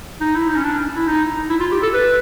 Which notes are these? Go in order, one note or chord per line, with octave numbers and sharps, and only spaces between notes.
D#4
E4
D#4
C#4
D4
E4
D#4
E4
F4
G4
A4
B4